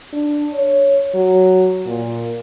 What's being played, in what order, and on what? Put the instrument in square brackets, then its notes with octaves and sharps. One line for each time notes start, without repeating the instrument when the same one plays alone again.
[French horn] D4
C#5
F#3
A#2